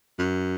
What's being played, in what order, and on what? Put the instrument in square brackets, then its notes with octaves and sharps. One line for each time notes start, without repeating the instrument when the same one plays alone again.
[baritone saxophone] F#2